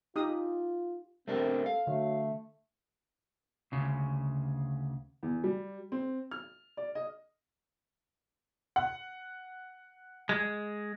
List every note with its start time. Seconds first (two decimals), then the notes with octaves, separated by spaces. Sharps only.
0.16 D#4 F4 G4 D#6
1.28 C3 A3 C4 D4 A#4
1.66 A4 F5
1.87 D3 F#3 A3
3.72 D2 C#3
5.23 E2
5.44 G3
5.92 C4
6.31 F6
6.77 D5
6.95 D#5
8.76 F#5
10.29 G#3